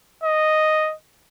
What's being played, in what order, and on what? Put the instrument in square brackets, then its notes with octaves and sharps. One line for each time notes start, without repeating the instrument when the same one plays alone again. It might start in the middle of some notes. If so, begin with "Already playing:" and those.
[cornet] D#5